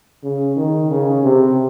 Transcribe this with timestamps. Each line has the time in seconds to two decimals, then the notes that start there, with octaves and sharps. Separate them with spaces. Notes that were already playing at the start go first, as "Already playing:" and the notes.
0.23 C#3
0.56 D#3
0.90 C#3
1.23 C3